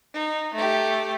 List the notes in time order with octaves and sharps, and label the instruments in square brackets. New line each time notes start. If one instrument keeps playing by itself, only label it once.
[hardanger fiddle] D#4
A3 G4